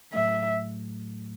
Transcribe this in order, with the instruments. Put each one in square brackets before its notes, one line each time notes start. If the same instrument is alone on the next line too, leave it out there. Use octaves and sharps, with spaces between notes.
[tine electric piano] A2 F#3 A3 [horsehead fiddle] E5